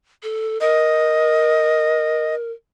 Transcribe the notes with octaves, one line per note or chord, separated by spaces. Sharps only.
A4
A#4 D#5